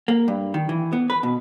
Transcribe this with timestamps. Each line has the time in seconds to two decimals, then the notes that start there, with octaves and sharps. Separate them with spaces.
0.08 A#3
0.28 G2
0.54 D#3
0.69 E3
0.93 B3
1.10 B4
1.23 B2